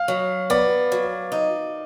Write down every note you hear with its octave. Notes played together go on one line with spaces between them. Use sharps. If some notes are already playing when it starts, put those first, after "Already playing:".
Already playing: F5
F#3
B3 D5
F#3
D#4